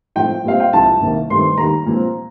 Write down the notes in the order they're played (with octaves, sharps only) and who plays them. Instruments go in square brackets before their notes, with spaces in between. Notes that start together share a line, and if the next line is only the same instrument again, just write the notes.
[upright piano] A2 F3 C4 G5
A#2 G3 C4 F5
G5
C2 C3 F3 A5
C2 C3 D#3 A#3
G2 D#3 A3 C4 C6
D#2 D#3 G3 A#5
A#2 F3 C4